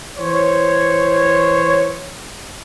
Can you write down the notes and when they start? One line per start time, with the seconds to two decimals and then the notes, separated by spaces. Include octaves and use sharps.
0.18 E3 C5 C#5